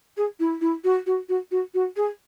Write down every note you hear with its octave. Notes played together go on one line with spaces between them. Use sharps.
G#4
E4
E4
F#4
F#4
F#4
F#4
F#4
G#4